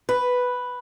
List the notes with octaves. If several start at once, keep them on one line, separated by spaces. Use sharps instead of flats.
B4